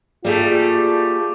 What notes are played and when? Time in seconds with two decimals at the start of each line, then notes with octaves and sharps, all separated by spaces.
0.25 G3 A3 A#3 F4 G#4 A4